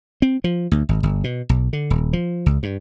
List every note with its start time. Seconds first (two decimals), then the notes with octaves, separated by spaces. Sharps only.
0.22 C4
0.44 F3
0.72 D2
0.89 G#1
1.03 G1
1.24 B2
1.49 B1
1.73 D3
1.90 D#1
2.13 F3
2.46 C#2
2.63 G2